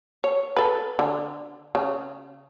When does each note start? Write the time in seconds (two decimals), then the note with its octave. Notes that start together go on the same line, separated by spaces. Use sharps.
0.24 C#5
0.56 A4 B4
0.99 D3
1.75 C#3